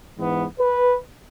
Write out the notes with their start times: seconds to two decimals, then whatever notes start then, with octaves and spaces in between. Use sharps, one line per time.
0.16 G#2 E3 B3
0.59 B4